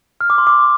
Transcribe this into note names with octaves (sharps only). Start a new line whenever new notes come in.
F6
D6
C6
D6